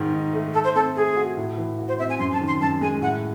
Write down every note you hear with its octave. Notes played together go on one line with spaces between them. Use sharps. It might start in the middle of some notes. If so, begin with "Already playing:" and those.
Already playing: G#2 D#3 D#4
D#4
A3
A3 A4
C5
C4 A4
A3 G#4
F#4
A2
E3
F#4
C5
C4 E5
G#5
F#2 C6
A5
D#3
C6
F#2 A5
G#3 G#5
A2 F#5